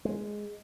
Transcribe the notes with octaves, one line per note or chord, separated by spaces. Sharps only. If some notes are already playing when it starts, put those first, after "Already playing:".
G#3